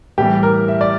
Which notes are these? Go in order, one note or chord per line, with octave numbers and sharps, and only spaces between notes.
A2 E3 G3 G4
A#4
E5
D5